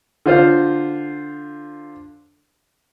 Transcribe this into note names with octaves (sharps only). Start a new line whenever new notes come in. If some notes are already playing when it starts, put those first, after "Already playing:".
D3 F4 C5 F6